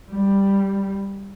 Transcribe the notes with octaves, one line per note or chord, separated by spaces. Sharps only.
G3